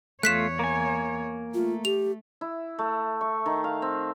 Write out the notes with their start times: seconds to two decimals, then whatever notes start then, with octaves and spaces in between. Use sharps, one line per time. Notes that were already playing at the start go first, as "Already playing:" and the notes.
0.23 E2 A3 F4 C#5 F#6 B6 E7
0.59 A#3 G#5
1.54 A3 F4
1.85 G4 F7
2.41 E4
2.79 A3
3.21 C#6
3.46 D#3
3.64 F5
3.82 C4